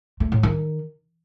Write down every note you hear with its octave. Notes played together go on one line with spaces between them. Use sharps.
A3
A2
D#3